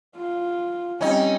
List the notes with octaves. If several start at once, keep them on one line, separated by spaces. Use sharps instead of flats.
F4
G3 C4 C#4 D#4